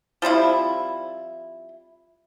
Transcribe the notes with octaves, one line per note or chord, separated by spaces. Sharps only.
F3 G3 C4 E4